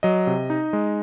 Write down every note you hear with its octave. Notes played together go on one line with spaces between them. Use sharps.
F#3 D#5
C3
D#4
G#3